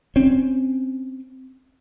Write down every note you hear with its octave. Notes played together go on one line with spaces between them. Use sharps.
C4 C#4